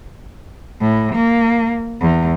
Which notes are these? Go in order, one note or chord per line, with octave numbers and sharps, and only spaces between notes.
A2
A#3
E2